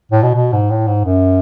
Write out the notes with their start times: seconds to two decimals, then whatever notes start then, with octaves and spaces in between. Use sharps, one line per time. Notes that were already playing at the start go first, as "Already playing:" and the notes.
0.12 A2
0.23 B2
0.35 B2
0.53 G#2
0.70 A2
0.88 G#2
1.05 F#2